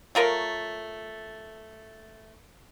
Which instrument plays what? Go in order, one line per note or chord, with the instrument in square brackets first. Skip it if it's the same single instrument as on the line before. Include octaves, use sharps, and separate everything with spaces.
[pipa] A3 F4 A#4 C#5